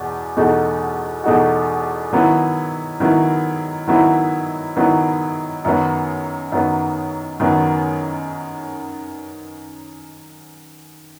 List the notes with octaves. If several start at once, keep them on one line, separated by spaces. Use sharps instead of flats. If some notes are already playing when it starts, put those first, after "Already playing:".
Already playing: E2 B2
E2 B2 A3 D#4 F#4
E2 B2 A3 D#4 F#4
D#3 F#3 B3 E4
D#3 F#3 B3 E4
D#3 F#3 B3 E4
D#3 F#3 B3 E4
F#2 D#3 F#3 B3
F#2 D#3 F#3 B3
F#2 D#3 F#3 B3